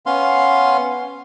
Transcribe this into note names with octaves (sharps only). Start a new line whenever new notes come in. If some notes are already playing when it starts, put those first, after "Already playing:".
B3 C#4 F5 C6